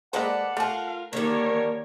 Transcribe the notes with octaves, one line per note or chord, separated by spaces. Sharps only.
G#3 A#3 A4 B4 C5 D5 F#5
A3 F4 A#4 F5 A5
D3 D#3 G3 A#3 A#4 C#5